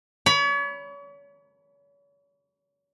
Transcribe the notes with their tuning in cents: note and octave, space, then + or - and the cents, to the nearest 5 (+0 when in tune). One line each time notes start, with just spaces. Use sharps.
C#5 +40 B5 +0